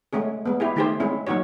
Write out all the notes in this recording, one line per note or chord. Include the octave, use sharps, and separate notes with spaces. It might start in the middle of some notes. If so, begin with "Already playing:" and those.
G#3 A3 C#4 G#4
G#3 B3
E4 G4 G#4
D#3 A3 D#4 G4 G#4 C5
G#3 C4 C#4 E4
F#3 A#3 D#4 F#4 C#5